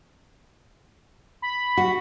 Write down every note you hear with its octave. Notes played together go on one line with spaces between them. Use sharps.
B5
F#4